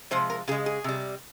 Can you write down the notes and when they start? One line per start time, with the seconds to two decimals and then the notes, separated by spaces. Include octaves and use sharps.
0.11 C3 F3 G#3 C5
0.30 A#4
0.48 C#3 G#4
0.52 G#3
0.66 G#4
0.84 C3 G3